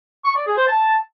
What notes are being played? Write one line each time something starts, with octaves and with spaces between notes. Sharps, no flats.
C#6
D5
G#4
C5
A5